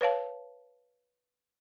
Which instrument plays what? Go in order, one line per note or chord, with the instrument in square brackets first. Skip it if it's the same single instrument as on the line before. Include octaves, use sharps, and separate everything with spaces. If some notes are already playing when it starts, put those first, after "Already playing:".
[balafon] B4 C#5 F5 A5